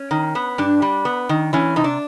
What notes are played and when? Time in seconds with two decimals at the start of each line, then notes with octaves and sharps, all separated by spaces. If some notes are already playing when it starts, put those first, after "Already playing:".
Already playing: C#4
0.11 D#3
0.35 B3
0.58 G2 D4
0.82 G3
1.05 B3
1.29 D#3
1.53 E3 C#4
1.76 C3 D#4
1.84 D4